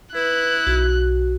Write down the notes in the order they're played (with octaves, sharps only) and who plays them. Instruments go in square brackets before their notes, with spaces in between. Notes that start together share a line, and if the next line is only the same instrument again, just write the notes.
[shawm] E4 [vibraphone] B4 [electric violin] F#6
[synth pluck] B1 [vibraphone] F#4